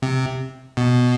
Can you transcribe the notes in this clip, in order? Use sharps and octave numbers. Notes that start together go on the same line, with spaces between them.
C3
B2